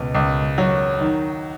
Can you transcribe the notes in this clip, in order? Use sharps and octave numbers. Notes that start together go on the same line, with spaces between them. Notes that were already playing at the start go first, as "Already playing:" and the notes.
Already playing: C#2 B2
C#2
F#3
D#3